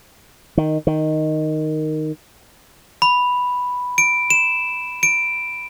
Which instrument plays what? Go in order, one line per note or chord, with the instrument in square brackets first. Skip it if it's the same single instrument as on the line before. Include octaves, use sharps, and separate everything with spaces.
[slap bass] D#3
D#3
[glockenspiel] B5
D7
E7
D7